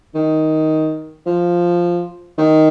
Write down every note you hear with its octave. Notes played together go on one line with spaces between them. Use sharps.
D#3
F3
D#3